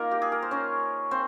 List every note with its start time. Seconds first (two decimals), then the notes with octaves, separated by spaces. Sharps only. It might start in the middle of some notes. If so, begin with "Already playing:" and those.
Already playing: A#3 D#4 F4 A#4
0.11 G4
0.22 G#4
0.32 A#4
0.42 C5
0.51 C#4 C#5
1.11 C4 C5